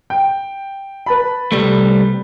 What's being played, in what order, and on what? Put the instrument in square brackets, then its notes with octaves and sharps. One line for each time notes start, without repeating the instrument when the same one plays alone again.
[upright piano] G5
B4 A5 B5
[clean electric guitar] C2 G3 A3